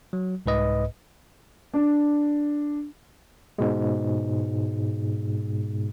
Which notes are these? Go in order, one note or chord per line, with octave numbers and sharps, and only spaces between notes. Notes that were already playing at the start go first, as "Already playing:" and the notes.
F#3
C2 G#2 B4 D#5
D4
G#2 B2 G#3